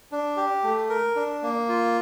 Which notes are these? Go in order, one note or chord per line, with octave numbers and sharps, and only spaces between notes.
D4
G4
A3
A#4
D4
A#3
F4